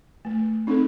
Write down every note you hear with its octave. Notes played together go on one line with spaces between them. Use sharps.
A3
C4 D#4 A4